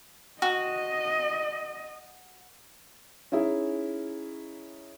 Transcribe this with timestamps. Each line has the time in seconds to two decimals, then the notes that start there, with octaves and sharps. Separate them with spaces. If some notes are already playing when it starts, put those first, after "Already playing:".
0.42 F#4 D#5
3.32 C#4 D#4 E4 G#4